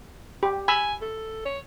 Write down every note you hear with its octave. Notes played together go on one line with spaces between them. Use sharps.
G4
G#5 B5 E6
A4
C#5